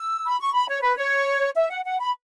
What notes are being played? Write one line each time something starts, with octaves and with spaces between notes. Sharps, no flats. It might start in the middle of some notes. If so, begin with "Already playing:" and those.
Already playing: E6
B5
C#6
B5
C#5
B4
C#5
E5
F#5
F#5
B5